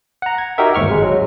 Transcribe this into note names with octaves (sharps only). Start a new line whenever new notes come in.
F#5 A#5
G#6
D#4 F#4 G4 A#4 E5
G1 D#2 G#2 C#6 F6
G#1 G#3
F#3